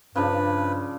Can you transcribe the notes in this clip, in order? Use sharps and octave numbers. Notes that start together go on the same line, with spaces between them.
G2 C#3 F3 D4 B4